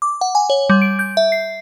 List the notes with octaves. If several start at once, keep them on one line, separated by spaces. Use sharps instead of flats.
D6
F#5
G#5
C#5
G3
D7
G6
E5
C7